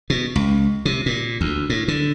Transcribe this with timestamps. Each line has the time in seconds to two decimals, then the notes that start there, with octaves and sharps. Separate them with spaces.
0.10 B2
0.36 C#2
0.85 C3
1.06 A#2
1.41 D2
1.70 A2
1.88 D3